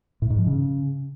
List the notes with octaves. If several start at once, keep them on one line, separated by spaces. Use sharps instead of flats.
A2
G#2
F3
C#3